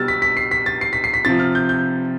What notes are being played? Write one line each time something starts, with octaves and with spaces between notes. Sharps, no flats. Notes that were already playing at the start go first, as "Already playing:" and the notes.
Already playing: B2 G3 E6 F6 A6
B6
B6
C7
B6
A6
C7
B6
C7
B6
C3 F3 A6
F6
G6
G6